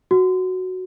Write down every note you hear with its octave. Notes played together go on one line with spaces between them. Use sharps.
F#4